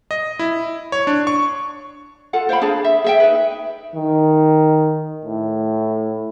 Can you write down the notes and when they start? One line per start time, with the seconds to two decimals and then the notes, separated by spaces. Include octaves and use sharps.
0.11 D#5
0.39 E4
0.92 C#5
1.07 D4
1.27 C#6
2.33 F4 A4 F#5
2.49 C5 F5 G5 B5
2.62 D4 G#4 F5 A5
2.85 E5
3.04 G#4 E5 G5
3.20 D#4 B4
3.95 D#3
5.25 A2